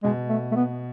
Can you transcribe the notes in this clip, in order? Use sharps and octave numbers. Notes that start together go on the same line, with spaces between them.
B2 G#3
A3
A3
B3